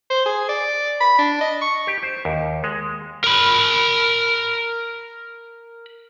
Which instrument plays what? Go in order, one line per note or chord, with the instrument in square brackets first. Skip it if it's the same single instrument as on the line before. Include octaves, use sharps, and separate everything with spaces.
[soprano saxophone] C5
G#4
D5
B5
D4
D#5
C#6
[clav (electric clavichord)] G4
C5
D#2
G#3
[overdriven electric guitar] A#4 B5